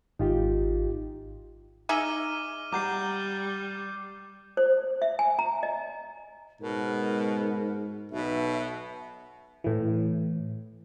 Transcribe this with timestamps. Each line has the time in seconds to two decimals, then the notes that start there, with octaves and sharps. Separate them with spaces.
0.19 G#1 D#4 F4 G4
1.89 D#4 G#4 E5 D6 F6 D#7
2.72 G3 D5 F#5 A#5 D6 G6 C7
4.57 C5
5.02 E5
5.19 G#5
5.39 A#5
5.63 D#5
6.61 G#2 B2 A#4
8.12 B1 B2 E5
9.64 A2 E3